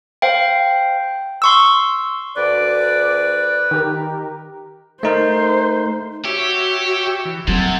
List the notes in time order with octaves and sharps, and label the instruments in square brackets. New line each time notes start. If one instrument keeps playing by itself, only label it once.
[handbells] C5 F5 G5
C6 C#6 E6
[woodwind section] D2 D5 [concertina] B4
[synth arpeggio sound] D#3 G4 A#4
[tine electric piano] A3 D#4 A#4 [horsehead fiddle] C5
[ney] F#4 [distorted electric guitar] G4 [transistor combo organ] C#5 E5
[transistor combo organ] E3
[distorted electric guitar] C3 [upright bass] F#3 [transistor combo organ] C4 G#4 A4 [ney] F#5